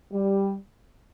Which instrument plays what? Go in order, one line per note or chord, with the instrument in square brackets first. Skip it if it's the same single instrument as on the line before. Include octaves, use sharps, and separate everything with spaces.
[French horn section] G3